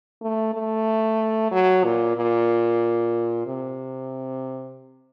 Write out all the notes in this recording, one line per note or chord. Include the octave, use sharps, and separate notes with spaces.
A3
A3
F#3
A#2
A#2
C3